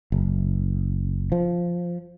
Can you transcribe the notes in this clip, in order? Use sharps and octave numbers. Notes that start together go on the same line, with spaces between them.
F#1
F3